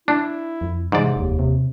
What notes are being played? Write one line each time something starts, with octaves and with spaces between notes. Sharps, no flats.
D4 E4
F2
G#2 C3 E3 D5
F1 D#2
C3